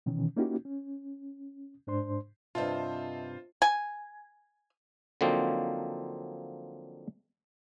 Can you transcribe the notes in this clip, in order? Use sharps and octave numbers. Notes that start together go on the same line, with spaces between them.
B2 D#3 E3 C#4
A#3 C#4 D#4 E4 F#4 G4
C#4
G#2 D4 C5 C6
G2 C3 F4 C5 D#5 E5 A5
G#5
D3 F3 F#3 A#3 C4 D#4